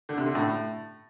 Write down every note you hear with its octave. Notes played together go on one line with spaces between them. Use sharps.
D3
C3
D3
A2